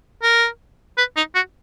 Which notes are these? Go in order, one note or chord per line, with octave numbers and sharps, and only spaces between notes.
A#4
B4
D#4
F#4